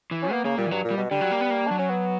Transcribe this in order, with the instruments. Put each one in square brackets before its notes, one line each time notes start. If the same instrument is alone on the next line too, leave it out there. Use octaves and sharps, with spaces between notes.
[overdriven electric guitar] E3
[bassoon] C#4
[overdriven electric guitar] A#3 [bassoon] B3
[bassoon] C#3 [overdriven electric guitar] A#3
[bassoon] A#2 [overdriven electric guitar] G3
[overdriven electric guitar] E3
[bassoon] G2 [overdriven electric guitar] F#3
[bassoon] A#2
[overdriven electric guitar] G3
[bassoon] B2
[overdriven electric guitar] D3 [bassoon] G3
[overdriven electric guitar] F#3
A#3
B3
A#3
[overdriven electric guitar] F#3 [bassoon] D4
[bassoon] C#4
B3